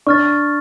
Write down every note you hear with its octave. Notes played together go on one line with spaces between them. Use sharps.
D4 C#6 F6 A6